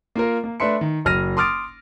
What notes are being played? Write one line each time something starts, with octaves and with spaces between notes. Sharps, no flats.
A#3 F4 A#4
A#3
A3 D4 B4 E5 C6 C#7
D#3
F#1 F#3 F6 A#6 D#7
C6 D6 D#6 F6 A6 D7